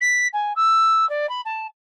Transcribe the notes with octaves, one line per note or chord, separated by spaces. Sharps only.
B6
G#5
E6
D5
B5
A5